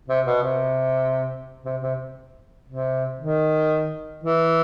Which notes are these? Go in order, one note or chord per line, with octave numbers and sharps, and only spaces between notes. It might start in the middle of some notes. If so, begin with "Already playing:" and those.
C3
B2
C3
C3
C3
C3
D#3
E3